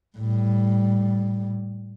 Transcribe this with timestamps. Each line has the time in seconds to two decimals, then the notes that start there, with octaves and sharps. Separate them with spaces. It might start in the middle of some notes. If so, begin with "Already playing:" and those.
0.17 A2 G3